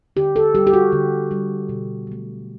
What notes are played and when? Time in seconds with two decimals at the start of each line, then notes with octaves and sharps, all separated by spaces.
0.16 D3 G4
0.36 A4
0.55 G3 G4
0.67 G4
0.73 F#4
0.92 D3
1.31 G3
1.69 B2
2.07 F#3 A3